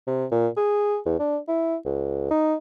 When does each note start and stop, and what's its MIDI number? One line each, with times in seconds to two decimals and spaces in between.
0.07 0.25 48
0.32 0.48 46
0.57 0.98 68
1.06 1.16 40
1.19 1.38 62
1.48 1.76 64
1.85 2.31 37
2.31 2.55 63